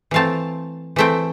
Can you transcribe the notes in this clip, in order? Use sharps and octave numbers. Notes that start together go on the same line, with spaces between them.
E3 A3 C4 F5 A5
E3 A3 C4 E5 G5